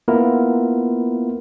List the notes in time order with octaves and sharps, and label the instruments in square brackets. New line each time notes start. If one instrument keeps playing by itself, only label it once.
[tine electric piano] A#3 B3 E4 F4 A#4